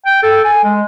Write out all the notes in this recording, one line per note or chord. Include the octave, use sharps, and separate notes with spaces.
G5
A4
G#5
G#3